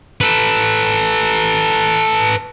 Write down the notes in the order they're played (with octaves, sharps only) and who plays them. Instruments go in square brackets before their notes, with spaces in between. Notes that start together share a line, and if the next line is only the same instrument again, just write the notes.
[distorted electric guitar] A4 B4